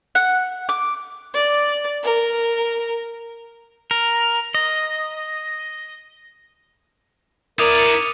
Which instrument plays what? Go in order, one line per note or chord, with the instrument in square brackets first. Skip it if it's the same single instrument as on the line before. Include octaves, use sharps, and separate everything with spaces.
[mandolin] F#5
D6
[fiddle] D5
A#4
[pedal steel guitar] A#4
D#5
[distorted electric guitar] E4 D5 [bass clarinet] A#4 [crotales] D6 D#6 D#7
[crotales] C#7